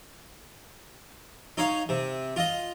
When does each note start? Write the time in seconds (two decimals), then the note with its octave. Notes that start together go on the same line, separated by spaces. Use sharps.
1.57 D#4 C#5 F5
1.89 C3
2.36 F4 D#5